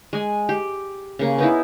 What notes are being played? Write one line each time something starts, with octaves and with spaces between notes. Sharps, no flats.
G#3 G#5
G4
C#3 A#3
B3 D#4 E4